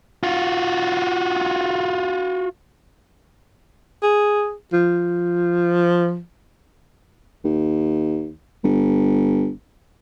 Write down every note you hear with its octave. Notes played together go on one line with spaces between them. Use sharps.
F4 F#4
G#4
F3
D#2
G1